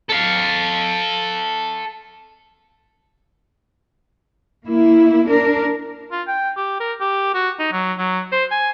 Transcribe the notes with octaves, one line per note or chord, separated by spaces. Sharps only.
A4 F5
A#3 E4
D4 A#4
F4
G5
G4
A#4
G4
F#4
D#4
F#3
F#3
C5
G#5